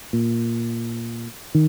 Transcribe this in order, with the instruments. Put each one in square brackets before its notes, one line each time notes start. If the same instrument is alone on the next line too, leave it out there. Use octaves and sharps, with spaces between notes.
[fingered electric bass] A#2
D#3